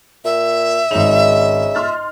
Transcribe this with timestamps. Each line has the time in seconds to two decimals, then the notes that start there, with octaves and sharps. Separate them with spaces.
0.25 A#2 E5
0.91 G#1 C#3 D#4 F7
1.75 C6 F6 A6